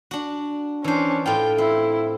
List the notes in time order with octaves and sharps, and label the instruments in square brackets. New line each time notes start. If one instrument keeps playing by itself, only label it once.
[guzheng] D4 F#4
[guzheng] E3 C5 [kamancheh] C#4 D4
[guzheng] A2 F4 [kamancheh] G5
[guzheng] C4 [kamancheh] E4